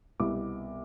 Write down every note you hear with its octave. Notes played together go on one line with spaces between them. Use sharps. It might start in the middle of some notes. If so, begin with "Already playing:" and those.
C2 B2 B3 D6